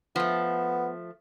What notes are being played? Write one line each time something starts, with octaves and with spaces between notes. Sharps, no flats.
F3 A3 B3